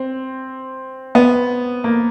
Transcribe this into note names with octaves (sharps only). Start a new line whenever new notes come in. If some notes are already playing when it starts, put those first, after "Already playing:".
Already playing: C4
B3
A#3